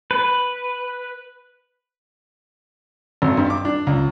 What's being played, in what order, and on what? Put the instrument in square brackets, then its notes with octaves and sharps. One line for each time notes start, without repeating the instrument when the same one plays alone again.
[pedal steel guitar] B4
[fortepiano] G#1
G2
D6
D4
C#2